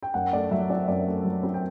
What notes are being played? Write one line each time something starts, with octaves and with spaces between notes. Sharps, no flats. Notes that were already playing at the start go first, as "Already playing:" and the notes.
G5
F#2 F#5
A3 D5
F#3 E5
C4 D5
F#2 D5
A3
F#3
C4
G5